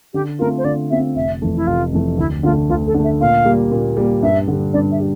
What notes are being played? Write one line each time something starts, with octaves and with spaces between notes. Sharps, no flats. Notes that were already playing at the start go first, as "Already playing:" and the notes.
D3 G4
A3 C4 F4 A#4
C5
D3 D5
A3 C4 F4 E5
F1 E5
F2 E3 A3
E4
F1 F4
F2 E3 A3
D2 E4
D3 A3 F4
D2 F4
A4
D3
A3 E5
A#2 F5
G3 A#3
A#2
G3 A#3
G2 E5
D3 G3
G2 D5
E5
G3